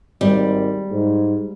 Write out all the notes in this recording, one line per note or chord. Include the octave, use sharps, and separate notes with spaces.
G#1 G3
G#2